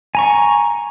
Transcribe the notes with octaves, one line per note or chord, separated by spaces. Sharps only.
G#5 A#5 C#6